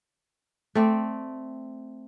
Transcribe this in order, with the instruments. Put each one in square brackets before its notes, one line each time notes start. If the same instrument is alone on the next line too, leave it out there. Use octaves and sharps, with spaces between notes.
[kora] A3 C4 D5